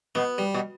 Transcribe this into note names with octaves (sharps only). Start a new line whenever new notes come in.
B2 B3
G3
B2